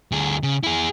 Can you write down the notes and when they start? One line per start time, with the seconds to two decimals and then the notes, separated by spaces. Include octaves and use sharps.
0.12 D2 G#4
0.43 C#3
0.63 E4 G#4